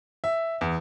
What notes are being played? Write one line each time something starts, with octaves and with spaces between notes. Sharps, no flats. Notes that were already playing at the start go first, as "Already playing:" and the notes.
E5
E2